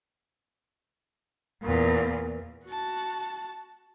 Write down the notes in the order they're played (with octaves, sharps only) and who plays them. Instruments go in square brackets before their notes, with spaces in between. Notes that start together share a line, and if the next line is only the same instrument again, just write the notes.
[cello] E2 A#2
[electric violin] F#4 A5